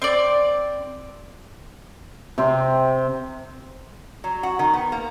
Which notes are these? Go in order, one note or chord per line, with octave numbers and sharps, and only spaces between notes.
C4 D5
C3 C4
F#3
F#4
D#3
B3
A#3